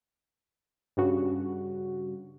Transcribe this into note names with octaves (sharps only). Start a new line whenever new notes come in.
G2 C#3 F#4